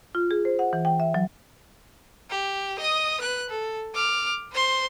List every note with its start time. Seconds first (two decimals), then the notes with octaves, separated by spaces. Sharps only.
0.15 F4
0.31 G#4
0.45 C5
0.59 F#5
0.73 E3
0.85 G5
1.00 E5
1.14 F#3
2.30 G4
2.79 D#5 D#6
3.21 B4 F#6
3.50 A4
3.94 D6 F6
4.52 C5 C6